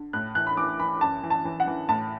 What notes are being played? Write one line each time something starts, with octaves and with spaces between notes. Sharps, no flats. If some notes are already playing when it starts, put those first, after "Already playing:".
Already playing: D3
A2 F#6
E3 F#6
B5
E3 D6
E3 B5
F#2 A5
E3
A5
E3
F#5
E3
A2 A5